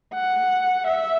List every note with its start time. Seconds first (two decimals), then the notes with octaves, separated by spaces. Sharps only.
0.14 F#5
0.87 E5